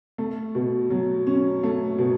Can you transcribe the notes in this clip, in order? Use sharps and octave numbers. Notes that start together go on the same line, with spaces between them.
A3
B2
F#3
C#4
A3
B2